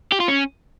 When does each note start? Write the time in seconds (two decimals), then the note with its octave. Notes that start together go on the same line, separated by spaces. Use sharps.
0.12 G4
0.20 F4
0.28 C#4